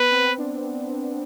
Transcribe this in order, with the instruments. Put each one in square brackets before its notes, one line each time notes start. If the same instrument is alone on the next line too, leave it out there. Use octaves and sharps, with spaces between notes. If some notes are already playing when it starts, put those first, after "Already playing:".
Already playing: [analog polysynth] B3 [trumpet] B4
[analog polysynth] C4
D4